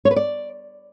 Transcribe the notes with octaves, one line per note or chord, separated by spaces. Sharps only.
C#5
B4
D5